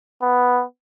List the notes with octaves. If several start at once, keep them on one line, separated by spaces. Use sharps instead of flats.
B3